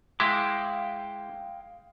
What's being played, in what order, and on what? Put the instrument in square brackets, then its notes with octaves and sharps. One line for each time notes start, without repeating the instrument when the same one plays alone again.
[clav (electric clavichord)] G#3 E4 [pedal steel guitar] F5 G5 D6